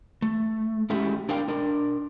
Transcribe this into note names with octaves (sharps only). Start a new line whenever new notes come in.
A3
G#3 A3 C#4 E4 F#4 G4
D4 A#4 F5 G5
D4 A#4